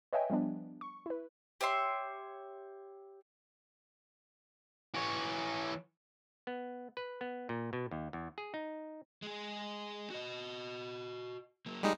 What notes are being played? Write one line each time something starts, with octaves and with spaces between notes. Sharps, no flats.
B4 C#5 D#5 E5 G5 G#5
F3 G3 B3 D4
C#6
E4 B4
G4 C#5 E5 C6
E3 C#5
B3
B4
B3
A#2
B2
D#2
E2
G#4
D#4
G#3 G#4
F#4 D#5
F#3 A#3
G3 G#3 D#4